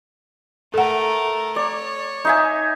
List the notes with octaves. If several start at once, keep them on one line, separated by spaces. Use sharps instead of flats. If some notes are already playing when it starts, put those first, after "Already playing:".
A3 A4 A#4 F#5
C#5 D5
D#4 E5 G#5